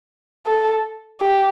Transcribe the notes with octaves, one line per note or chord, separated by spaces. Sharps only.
A4
G4